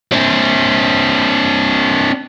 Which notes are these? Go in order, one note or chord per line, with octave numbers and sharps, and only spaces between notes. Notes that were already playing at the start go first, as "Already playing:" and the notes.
C4 D4